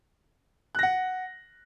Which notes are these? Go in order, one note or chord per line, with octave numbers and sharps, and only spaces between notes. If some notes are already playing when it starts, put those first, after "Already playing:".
F#5 F#6 A#6